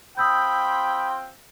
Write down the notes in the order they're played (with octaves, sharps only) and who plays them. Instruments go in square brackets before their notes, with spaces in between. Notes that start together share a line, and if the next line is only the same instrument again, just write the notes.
[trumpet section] C4 F4 G5 [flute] B5 [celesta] D#6 E6 G6